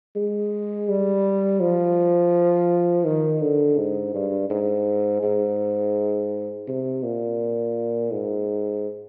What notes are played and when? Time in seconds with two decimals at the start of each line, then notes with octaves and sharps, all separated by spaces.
0.16 G#3
0.89 G3
1.61 F3
3.06 D#3
3.42 D3
3.78 G#2
4.14 G2
4.50 G#2
5.23 G#2
6.68 C3
7.03 A#2
8.11 G#2